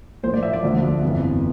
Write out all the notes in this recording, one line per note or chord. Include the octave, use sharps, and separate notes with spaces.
A#1 A2 F3 C5
D5
E5
D5
E1 D2 D3 F3
G1 F2 E3